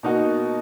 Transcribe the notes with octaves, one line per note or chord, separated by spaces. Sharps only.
B2 A#3 D#4 F#4